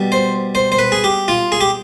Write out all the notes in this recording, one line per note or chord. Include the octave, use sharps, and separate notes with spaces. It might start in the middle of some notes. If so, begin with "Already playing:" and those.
Already playing: B2 G3
C5
C5
C5
B4
G#4
G4
F4
G#4
G4